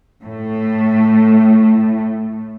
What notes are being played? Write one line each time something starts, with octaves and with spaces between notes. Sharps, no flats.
A2 A3